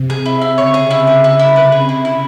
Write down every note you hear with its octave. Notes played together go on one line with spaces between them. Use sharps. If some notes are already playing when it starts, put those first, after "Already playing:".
Already playing: C3
G#4
E4
E4
C#3 C#5
G#4
E4
C#3 G#4
E4
E4
C3 B4
G#4
E4
E4